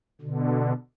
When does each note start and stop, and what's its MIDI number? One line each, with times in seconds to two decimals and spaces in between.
0.22 0.73 47
0.22 0.73 50